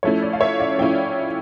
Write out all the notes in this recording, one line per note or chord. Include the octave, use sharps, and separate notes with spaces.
F3 A3 C#4 E4 C#5
D5
F5
C#5 E5
D5 F5
F3 A3 C#4 E4 E5 G5